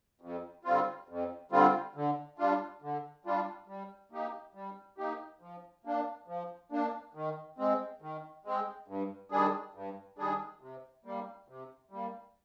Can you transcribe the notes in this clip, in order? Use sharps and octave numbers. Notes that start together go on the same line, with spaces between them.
F2
D3 G3 C4 F4
F2
D3 G3 C4 F4
D3
G3 D4 F4
D3
G3 D4 F4
G3
A#3 D#4 G4
G3
A#3 D#4 G4
F3
A#3 D4
F3
A#3 D4
D#3
G#3 C4
D#3
G#3 C4
G2
D#3 G3 D4 G#4
G2
D#3 G3 D4 G#4
C3
G3 A#3
C3
G3 A#3